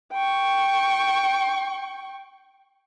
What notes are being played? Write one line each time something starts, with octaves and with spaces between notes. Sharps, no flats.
G5 C#6